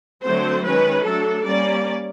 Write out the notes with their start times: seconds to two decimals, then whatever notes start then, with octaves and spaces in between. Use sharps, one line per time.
0.23 D3 F#3 A3 C4 C5
0.64 D#3 G#3 C#4 B4
1.05 F#3 A3 D4 A4
1.46 G3 A#3 C#4 D5